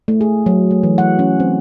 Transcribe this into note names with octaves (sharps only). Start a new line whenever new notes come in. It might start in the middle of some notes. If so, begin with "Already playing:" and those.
A3
G#4
F#3
A3
E3
F#5
C#4
C4